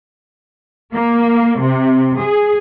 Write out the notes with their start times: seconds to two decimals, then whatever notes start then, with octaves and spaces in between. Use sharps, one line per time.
0.94 A#3
1.60 C3
2.20 G#4